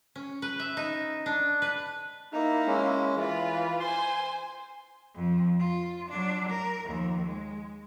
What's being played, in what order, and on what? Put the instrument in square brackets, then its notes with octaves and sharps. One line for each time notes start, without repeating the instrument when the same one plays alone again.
[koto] C#4
B4
E5
D#4
D4
B4
[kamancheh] A#3 E4 [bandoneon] D#4
[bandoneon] G#3 C#4
[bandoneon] E3 [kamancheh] F4 B4
[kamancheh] C5 G#5 [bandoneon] C6
[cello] F2 F3
F4
F#3 D4
A#4
D#2 F3
G#3